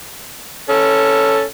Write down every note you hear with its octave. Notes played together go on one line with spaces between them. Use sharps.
C#4 A4